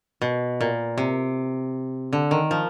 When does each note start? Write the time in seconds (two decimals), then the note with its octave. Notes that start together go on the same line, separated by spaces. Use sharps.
0.22 B2
0.61 A#2
0.98 C3
2.13 D3
2.31 D#3
2.51 F3